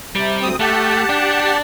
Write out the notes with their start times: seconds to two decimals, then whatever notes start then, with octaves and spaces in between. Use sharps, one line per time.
0.16 C3 G3
0.42 D2 C4 D#6
0.60 A3 G4 F#5 A5
1.10 D4